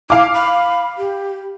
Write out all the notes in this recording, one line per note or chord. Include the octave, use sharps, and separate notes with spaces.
E4 F5 D6
B5
G4